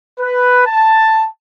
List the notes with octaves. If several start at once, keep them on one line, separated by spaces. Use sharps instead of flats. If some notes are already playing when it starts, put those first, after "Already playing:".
B4
A5